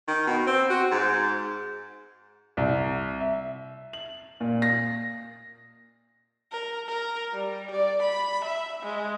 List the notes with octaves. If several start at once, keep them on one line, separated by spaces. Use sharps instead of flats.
D#3
B2
C4
F#4
G#2
C2
E5
F#7
A#2
A#6
A#4
A#4
G3
D5
B5
E5
G#3